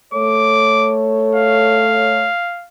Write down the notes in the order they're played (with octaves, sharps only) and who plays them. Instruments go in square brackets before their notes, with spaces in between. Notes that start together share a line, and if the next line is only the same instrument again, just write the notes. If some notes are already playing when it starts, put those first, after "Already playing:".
[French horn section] A3 A4 C#5 [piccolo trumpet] D6
[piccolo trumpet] F5